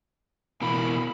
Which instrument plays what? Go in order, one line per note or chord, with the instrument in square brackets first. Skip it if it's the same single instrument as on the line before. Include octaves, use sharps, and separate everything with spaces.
[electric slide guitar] B2 E3 A#3 [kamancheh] B5